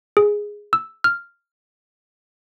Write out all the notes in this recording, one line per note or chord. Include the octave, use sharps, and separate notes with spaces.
G#4
E6
F6